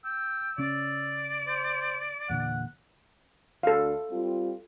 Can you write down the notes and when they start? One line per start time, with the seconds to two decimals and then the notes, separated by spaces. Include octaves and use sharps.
0.05 G5 E6
0.58 C#3 C#4 D5
1.48 C5
2.29 E2 A#2 D3 F#5
3.63 D2 A4 F5
4.11 G3 C4 F4